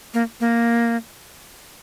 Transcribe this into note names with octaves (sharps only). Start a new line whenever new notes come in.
A#3
A#3